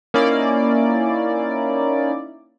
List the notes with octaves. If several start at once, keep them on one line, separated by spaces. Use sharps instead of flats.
A#3 C#4 D#4 E4 D5